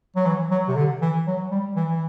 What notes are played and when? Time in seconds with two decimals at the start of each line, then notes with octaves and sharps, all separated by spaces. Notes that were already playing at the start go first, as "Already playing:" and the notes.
0.16 F#3
0.26 E3
0.51 F#3
0.68 C3
0.76 D3
1.01 E3
1.27 F#3
1.51 G3
1.76 E3
1.90 E3